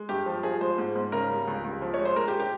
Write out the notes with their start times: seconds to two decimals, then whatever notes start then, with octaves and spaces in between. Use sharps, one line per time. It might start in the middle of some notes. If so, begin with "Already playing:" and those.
Already playing: G#3
0.09 G2 G4
0.26 F3
0.43 F3 G#4
0.61 G#3 C5
0.78 G#2
0.95 G#2
1.12 C#3 A#4
1.30 G3
1.48 C#2
1.65 C#2
1.82 F3
1.94 C#5
1.99 G#3
2.05 C5
2.16 G#3 A#4
2.28 G4
2.40 G4